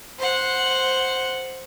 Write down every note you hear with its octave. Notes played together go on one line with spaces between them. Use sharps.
C5 F#5